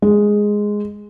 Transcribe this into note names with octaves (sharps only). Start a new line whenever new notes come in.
G#3